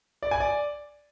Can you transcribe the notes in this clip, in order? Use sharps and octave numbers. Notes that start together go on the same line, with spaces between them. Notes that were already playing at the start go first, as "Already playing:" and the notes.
D5
G#5
D5